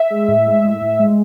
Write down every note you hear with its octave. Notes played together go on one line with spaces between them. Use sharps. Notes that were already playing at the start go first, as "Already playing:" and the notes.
Already playing: E5
G#3
A2
G#3
A2
A2
G#3